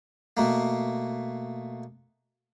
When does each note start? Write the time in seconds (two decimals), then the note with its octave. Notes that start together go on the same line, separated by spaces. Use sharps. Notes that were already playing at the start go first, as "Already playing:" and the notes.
0.37 B2 A3 A#3